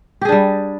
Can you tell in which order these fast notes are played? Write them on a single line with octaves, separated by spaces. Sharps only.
G4 G#4 D4 G3